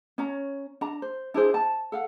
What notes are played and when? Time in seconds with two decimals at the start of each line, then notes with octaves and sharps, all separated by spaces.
0.18 C#4 C#5 A#5
0.81 D4 A#5
1.02 C5
1.34 D4 E4 G#4 C5
1.54 A5
1.92 A4 F5 F#5